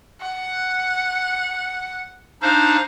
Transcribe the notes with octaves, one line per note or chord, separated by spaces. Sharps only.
F#5
D4 D#4 C5 F5